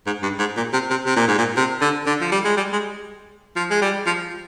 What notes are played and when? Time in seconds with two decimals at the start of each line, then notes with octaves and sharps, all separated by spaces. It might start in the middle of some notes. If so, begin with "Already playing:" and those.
0.06 G#2
0.23 G2
0.39 G#2
0.57 A#2
0.73 C3
0.90 C3
1.06 C3
1.16 A#2
1.28 G#2
1.38 A#2
1.56 C3
1.81 D3
2.06 D3
2.21 F3
2.32 G3
2.45 G#3
2.57 G3
2.73 G#3
3.56 F3
3.70 G#3
3.82 G3
4.06 F3